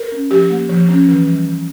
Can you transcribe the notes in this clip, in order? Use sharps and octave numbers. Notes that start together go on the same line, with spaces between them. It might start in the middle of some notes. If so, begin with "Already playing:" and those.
Already playing: A#4
C#4
F3 G4
A#3
F3
C#4
E3
G3
E3